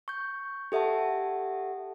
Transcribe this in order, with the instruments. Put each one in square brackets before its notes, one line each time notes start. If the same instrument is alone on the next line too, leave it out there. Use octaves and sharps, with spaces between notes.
[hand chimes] C#6 G6
G4 A4 E5 F#5 A5